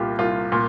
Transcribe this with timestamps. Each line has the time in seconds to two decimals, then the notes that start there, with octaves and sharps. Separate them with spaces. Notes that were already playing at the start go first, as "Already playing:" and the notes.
Already playing: C2 A#2 F4 G4
0.19 C2 F4
0.52 A#2